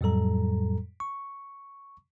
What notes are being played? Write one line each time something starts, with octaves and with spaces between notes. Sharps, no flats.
F2 A2 F#3 G3 A4 A#5
C#6